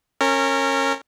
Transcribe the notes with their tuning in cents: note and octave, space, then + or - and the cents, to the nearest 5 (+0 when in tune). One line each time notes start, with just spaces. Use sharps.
C#4 -20 A#4 -25